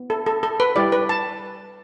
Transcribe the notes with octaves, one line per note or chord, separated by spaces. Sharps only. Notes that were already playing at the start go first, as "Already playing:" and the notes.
Already playing: B3
A4
A4
A4
B4
G3 E4 G4 D5
B4
A5